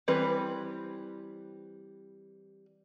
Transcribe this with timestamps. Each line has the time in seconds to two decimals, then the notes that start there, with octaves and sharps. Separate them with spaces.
0.08 E3 G3 C4 B4